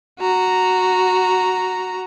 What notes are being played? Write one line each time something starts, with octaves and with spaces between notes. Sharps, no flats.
F#4 A#5